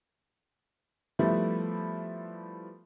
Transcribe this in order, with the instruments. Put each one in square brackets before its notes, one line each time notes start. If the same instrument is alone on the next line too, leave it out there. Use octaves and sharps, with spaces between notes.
[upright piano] F3 G3 A3 B3 E4